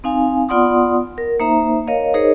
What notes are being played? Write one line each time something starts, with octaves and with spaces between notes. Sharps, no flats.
C4 D#4 F5 G#5
B3 F4 D5 F#5 C6 D#6
A#4
A#3 D#4 C5 E5 A#5
A#4 C#5 D#5 F5
D#4 G#4 A#4 C5 C#5 D#5